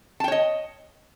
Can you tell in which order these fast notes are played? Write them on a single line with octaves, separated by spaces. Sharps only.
A5 G5 C#5 D#5